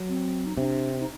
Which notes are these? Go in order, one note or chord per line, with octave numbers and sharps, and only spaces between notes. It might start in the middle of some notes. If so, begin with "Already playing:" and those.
Already playing: F#3
C4
D#4
C3 D4
D#4